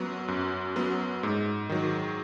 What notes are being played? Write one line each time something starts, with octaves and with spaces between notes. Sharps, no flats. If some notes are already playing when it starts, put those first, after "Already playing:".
Already playing: F#2 F#3 B3
F#2
F#3 B3
G#2
D#3 F#3